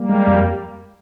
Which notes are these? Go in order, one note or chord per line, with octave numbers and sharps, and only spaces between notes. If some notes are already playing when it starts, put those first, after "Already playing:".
Already playing: G3 A#3
G#3
F2